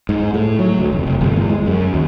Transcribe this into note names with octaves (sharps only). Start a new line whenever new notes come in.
G#2
A2
F#3
D2
F1
F1
G1
E2
G#3
F#2
D#2